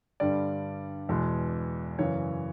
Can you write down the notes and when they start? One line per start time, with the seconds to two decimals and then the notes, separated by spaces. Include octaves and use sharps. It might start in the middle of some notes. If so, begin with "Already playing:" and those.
0.20 G2 D3 G3 D5
1.09 E2 B2 G#3
1.99 F#2 C#3 E3 C#5